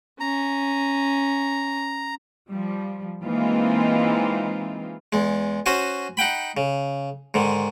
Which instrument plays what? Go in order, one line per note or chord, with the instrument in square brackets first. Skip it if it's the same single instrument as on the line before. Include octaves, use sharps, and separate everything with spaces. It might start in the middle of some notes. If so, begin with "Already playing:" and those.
[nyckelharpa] C#4 [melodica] A#5
[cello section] F3 G3
E3 G#3 A#3 C4 D#4 F4
[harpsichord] E2 G#3
C#4 F#4 C5 G#5
D#4 F#5 G5 B5
C#3
G#2 D3 D#3